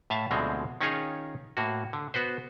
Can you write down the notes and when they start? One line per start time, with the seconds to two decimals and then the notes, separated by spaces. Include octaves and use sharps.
0.10 A2 E5 F5 A5
0.31 D2 B2 D3 F3 G#3 C4
0.81 D#3 C#4 D#4 F4 G#4 C#5
1.57 A2 A#3 F#4
1.93 D3
2.14 B3 F#4 B4 C5